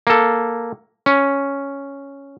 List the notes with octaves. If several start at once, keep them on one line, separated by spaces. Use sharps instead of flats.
A#3 A4
C#4